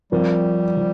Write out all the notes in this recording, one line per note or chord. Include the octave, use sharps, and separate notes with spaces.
F3 G3 C4 F4 A#4
F3